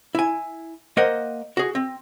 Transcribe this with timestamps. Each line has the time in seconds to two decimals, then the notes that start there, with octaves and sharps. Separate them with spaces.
0.15 E4 G#5
0.97 A#3 A#4 C5 D#5 F#5
1.57 F#4 G#4
1.75 C4